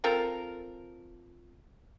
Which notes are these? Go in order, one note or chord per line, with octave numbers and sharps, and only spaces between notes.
C4 F4 A4 A#4